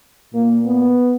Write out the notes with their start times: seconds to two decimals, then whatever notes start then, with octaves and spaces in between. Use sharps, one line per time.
0.33 A#2 A#3
0.66 B3